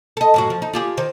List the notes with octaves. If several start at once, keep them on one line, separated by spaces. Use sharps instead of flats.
A4 D#5
F#2 A2 F#4
F3
D#4
F4 G4 G#4
D#3 C5